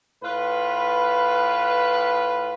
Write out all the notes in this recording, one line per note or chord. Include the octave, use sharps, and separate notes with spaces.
A2 F4 B4